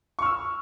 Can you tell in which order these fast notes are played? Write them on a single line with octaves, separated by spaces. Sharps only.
C#6 F6 E6